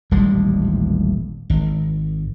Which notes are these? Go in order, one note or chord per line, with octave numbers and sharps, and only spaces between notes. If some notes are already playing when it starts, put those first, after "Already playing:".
D#1 A1 G3 G#3
G#1